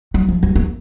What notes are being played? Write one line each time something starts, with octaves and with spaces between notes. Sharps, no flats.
F#3
F3
F#3
A#3